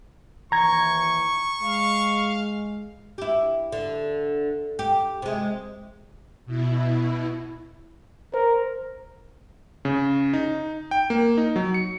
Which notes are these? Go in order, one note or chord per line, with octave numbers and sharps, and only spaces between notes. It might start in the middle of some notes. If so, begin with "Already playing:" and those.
D#2 E3 A#5 C#6 G#6
G#3 F5
E4 G4
D3
G4
C3 G#3
B2 E4
A#4 C5
C#3
D#4
G5
A#3
D#4
F#3
C#7